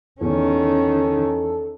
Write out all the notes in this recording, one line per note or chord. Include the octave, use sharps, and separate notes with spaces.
E2 D#3 C#4 A4